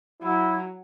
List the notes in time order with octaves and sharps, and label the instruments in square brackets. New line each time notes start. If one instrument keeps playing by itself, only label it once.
[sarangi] F#3 [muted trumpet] E4